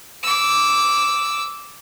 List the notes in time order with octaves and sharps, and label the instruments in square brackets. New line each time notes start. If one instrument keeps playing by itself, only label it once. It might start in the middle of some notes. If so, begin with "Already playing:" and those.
[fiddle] D6 E6